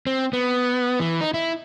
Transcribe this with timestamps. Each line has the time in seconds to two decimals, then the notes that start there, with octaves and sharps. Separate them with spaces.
0.07 C4
0.33 B3
1.00 E3
1.21 D#4
1.34 E4